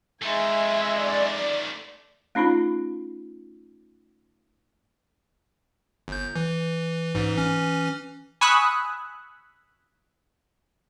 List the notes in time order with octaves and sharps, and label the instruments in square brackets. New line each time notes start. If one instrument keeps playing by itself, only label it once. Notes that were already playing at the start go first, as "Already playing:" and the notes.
[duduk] G#3 [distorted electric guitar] A3 D#4 [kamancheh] E5 G#5
[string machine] D5
[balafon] A3 C#4 D#4 F4 B5
[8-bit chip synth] G1 G6
E3
A1 G#2 E3
E3 C#4
[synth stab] G#5 B5 C#6 D#6 E6 F#6